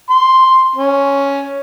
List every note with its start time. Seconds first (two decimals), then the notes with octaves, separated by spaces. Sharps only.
0.10 C6
0.76 C#4